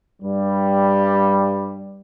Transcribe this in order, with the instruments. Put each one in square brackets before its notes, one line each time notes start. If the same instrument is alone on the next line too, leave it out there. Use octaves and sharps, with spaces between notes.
[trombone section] G2 G3